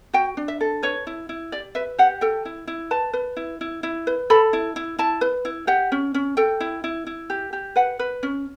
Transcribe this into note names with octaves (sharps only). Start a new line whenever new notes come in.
F#4 G5
D4
E5
A4
B4 C#5
E4
E4
G4 D5
B4 E5
G4 F#5
A4 G5
E4
E4
B4 A5
B4
E4
E4
E4
B4
A4 B5
E4
E4
E4 A5
B4
E4
G4 F#5
C#4
C#4
A4 G5
E4
E4
E4
G4
G4
B4 F#5
B4
C#4